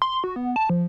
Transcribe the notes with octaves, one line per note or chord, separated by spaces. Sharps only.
C6
F#4
B3
A5
F3